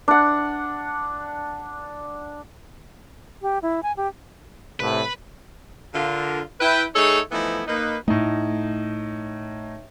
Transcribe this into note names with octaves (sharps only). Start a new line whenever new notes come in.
D4 F#5
G4
E4
G#5
G4
C2 A2 B4
D3 F4 A#4
E4 B4 G5
A3 D#4 G#4 A4 C#5
E3 F3 A3 B3 D#4 E4
A#3 D#4 B4
A2 A3 D#4